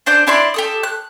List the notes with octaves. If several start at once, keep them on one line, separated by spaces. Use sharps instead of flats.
D4 C5 D5 G6
D4 E4 D5 C6
G4 A4 D#6
F#6